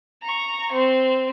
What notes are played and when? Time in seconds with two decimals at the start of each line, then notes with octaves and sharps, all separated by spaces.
0.22 A#5 C#6
0.72 C4